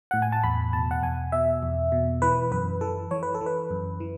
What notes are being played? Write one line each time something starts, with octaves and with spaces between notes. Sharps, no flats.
A2 F#5
G#5
A5
E2 B5
B2 A5
F#5
E2 G#5
B2 E5
E2
B2
E3 B4
F#2 B4
E3 A4
E3 C#5
B4
A4
E3
B4
F#2
E3